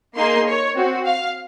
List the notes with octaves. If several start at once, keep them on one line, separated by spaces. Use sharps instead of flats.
A#3 D#4 G#4 C6
C#5
C4 F#4
F5